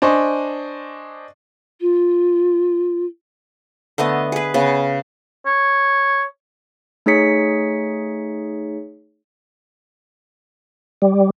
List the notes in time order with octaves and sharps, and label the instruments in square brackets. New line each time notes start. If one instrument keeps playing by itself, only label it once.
[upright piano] D4 C5 D#5 G#5 C#6
[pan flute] F4
[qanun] D3 A3 B3 D#5
G#4 B4
C#3 B3
[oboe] C#5
[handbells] A3 D#4 G#4 C#5 B6 C#7
[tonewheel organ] G3